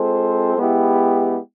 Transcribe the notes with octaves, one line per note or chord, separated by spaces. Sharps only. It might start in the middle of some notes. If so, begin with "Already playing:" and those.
Already playing: G#3 C4 F4 A4 C5
G#3 B3 E4 G4